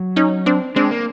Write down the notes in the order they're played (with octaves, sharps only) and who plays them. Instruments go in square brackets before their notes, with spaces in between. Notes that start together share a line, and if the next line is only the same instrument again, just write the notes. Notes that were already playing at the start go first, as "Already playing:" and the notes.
Already playing: [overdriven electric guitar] F#3
[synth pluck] C#4 D#4
C4 D4
[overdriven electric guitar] G#3 [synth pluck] C4 D4
[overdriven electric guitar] A#3